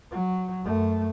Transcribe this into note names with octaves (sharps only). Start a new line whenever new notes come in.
F#3
F#2 A3